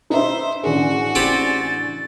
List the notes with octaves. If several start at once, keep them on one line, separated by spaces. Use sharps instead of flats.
D#4 B4 C5 E5
A1 D4 F#4 G#4
C4 G4 B5 A6